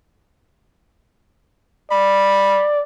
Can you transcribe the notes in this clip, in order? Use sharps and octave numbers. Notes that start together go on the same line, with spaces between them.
D5 B5